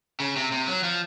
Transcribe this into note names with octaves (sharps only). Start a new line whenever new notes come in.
C#3
C3
C3
F#3
F3